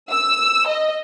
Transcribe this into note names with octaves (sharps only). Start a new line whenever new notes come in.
E6
D#5